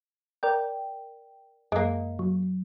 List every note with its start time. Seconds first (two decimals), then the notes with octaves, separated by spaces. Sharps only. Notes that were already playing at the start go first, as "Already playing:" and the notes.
0.43 A#4 D5 G5
1.72 F#2 G#3 A#3
2.19 F#3